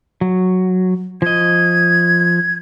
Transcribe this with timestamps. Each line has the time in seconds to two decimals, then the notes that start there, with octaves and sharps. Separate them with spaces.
0.21 F#3
1.22 F3 D#5 G#6